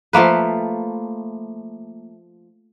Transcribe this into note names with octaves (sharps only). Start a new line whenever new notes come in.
F3 A3 A#3 B4